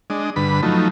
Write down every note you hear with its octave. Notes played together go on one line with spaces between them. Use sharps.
G#3 D4 D#5
G2 D3 B4 B5
F3 F#3 A3 D#4